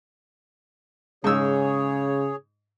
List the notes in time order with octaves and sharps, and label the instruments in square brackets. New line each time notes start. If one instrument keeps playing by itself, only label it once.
[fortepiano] G#2 E6 [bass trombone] C#3 [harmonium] G#4 C#5